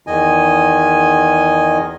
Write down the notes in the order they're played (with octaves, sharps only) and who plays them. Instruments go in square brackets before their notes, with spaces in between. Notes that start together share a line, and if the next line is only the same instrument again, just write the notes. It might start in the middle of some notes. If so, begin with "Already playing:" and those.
[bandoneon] E2 D#3 D#5 G#5